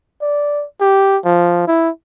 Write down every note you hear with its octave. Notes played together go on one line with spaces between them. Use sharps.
D5
G4
F3
E4